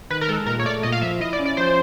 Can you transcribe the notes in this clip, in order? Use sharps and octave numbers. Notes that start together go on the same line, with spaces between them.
D#3 B4
A#4
G#3 A4
A#2 A#4
C#5
A3 D5
A#2 D#5
F5
F3 E5
E4 D#5
D5
C#4
D5
F3 C5